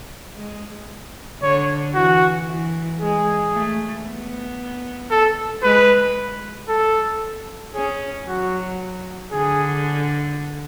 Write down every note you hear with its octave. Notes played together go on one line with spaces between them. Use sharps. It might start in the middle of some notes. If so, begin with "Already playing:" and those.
G#3
D3 C#5
E3 F#4
E3
G#3 G#4
A3
B3
A4
G#3 B4
A4
C#4 G#4
F#3 F#4
D3 G#4